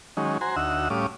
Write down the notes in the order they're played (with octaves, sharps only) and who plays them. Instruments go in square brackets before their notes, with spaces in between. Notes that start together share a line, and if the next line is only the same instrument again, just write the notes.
[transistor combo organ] D#3 F#3 G#3 C#4 D#4
F#4 C5 G#5 A#5 C6
D2 D#4 F#4 E5 F#5 E6
A2 G3 C#4 F5 D6 D#6